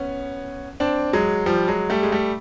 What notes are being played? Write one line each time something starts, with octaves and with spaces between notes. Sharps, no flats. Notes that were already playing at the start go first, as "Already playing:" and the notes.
Already playing: B3 C#4
C4 D4
F#3 G#3
F3 G3
F#3 G#3
G3 A3
G#3
G3 A3